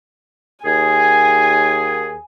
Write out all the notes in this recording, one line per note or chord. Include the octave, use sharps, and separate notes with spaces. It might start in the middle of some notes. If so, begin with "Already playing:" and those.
D#2 G#4 G#5